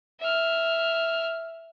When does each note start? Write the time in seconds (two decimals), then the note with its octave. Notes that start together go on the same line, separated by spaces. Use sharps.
0.20 E5 F6